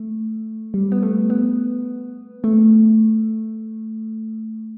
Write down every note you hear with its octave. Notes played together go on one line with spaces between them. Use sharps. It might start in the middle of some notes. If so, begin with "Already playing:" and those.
Already playing: A3
G3
B3
A3
B3
A3